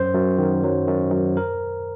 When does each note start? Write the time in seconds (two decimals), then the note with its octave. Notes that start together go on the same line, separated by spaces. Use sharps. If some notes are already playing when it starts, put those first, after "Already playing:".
Already playing: F#2 C5
0.15 F#2
0.38 D#3
0.64 F#3
0.88 F#2
1.12 F#2
1.37 A#4